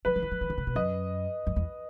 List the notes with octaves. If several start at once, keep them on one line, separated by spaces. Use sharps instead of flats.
F#3 B4
F#3
E3
F#3
E3
D#3
C#3
B2
F#2 D#5
F#2
E2